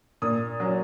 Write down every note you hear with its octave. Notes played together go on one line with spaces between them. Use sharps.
A#2 D#6
F#3 C#4